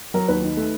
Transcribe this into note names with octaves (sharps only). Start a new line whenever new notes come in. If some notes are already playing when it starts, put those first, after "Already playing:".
F#3 A#4
D#2 B4
D#3
A3